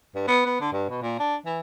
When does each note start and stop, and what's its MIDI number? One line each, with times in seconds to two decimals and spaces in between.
0.15 0.23 43
0.27 0.41 59
0.46 0.56 59
0.61 0.68 50
0.72 0.87 43
0.89 0.99 47
1.02 1.17 46
1.19 1.35 62
1.46 1.60 52